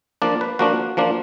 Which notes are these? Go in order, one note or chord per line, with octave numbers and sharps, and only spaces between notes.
F3 A#3 D4 D5
B4
F3 A#3 D4 F#4
F3 A#3 D4